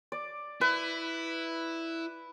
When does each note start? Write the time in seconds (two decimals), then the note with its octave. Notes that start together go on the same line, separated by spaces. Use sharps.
0.12 D5
0.61 E4 B4